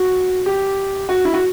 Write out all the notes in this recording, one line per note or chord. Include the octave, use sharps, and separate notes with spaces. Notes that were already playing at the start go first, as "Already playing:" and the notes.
Already playing: F#4
G4
F#4
E4
F#4